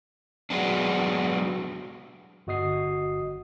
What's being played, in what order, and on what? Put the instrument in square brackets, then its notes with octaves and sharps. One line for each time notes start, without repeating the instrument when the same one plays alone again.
[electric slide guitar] F#3 G#3 B3 D4
[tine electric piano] G1 F#4 D#5 D#6 C7